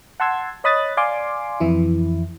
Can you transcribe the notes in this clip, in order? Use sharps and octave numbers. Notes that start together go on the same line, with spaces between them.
F#5 A5 C6 E6 G#6
C#5 D#5 B5 D#6 F#6 A6
D5 F5 G#5 C6 D6
F2 E3 E4